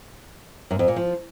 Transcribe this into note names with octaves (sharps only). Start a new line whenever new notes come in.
F#2
F2
A#2
F3